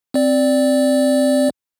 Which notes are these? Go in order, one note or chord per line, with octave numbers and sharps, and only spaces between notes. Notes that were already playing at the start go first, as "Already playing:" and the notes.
C4 D5